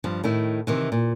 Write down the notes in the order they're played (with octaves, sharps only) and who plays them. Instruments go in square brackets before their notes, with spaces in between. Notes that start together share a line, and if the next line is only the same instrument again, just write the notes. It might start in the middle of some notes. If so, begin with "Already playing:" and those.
[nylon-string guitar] G2 F3
A2 D#3 E4
C3 D#3 E3
A#2